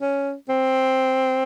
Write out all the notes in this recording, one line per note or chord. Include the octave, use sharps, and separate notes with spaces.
C#4
C4